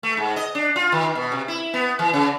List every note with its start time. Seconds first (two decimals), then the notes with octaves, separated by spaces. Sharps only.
0.03 A3
0.17 G#2
0.36 D#5
0.55 D4
0.76 F4
0.92 D#3
1.15 B2
1.32 C3
1.48 E4
1.74 B3
1.99 E3
2.13 C#3